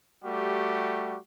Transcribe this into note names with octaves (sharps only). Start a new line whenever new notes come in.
G3 A3 F#4 G4